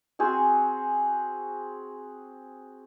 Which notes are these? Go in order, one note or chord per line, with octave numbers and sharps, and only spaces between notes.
C4 F#4 G#4 C5